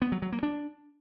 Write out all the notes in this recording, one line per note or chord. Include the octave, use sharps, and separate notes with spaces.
B3
F#3
F#3
A#3
D4